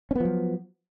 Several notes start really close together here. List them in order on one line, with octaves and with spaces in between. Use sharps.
C#4 B3 F3 F#3